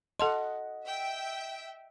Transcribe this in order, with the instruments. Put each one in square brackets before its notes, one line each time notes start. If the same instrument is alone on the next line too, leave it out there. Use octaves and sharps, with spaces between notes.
[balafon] A4 A5 C6 [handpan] D#5 F#5
[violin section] E5 G5